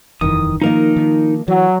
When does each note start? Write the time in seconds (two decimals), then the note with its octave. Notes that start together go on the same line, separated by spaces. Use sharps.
0.21 D#1 F2 D#3 E3 D#6
0.61 D#3 F3 A#3 D#4 A#4 D#5
0.96 D#3
1.48 E3 F#3